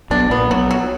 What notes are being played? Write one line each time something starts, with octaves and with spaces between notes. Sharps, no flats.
B1 B2 D4
A#1 A#2 B3
B1 B2 F#3
F#3